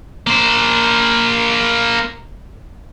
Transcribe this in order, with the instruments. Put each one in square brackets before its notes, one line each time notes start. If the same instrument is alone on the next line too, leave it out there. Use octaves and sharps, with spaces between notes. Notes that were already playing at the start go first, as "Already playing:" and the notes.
[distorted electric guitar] A#3 C5